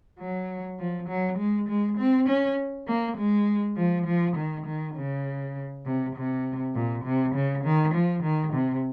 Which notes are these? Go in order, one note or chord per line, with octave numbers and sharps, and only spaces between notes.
F#3
F3
F#3
G#3
G#3
C4
C#4
A#3
G#3
F3
F3
D#3
D#3
C#3
C3
C3
A#2
C3
C#3
D#3
F3
D#3
C3